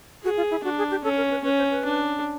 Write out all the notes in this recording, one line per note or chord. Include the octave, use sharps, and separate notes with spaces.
F#4 G#4
F4
E4
D4 F#4
G#4
G4
C#4 A4
A#4
B4
C#4 B4
C5
B4
D4